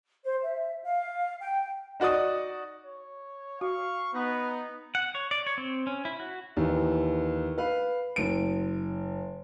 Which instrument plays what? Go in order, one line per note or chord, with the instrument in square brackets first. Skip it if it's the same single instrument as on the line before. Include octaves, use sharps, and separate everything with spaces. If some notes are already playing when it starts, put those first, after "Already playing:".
[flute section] C5
E5
F5
G5
[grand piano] D#4 F#4 D5 C#6 D#6
[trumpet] C#5
[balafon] F#4 [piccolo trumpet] F5 [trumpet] C#6
[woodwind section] B3 [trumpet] D#4 [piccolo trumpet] B4
[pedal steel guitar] F#5
C#5
D5
C#5
C4
C#4
E4
F#4
[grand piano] D#2 E3
B4 F5
F#1 D7